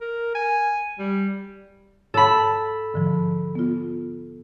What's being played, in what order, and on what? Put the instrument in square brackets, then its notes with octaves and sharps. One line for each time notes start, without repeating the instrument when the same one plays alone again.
[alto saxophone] A#4
G#5
G3
[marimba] G#2 C#5 [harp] A4 B5
[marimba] G#2 D3 F3
B3 F4